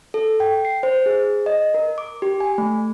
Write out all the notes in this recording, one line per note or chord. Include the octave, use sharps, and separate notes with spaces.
A4
G5
C7
C5
G#4
D#5
A#4
D6
G4
G#5
A3